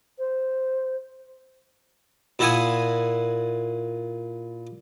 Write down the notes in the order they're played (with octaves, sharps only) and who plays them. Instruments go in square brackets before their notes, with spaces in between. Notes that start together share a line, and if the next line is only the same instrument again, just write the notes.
[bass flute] C5
[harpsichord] A#2 E4 E5 F#5 G#5 D#6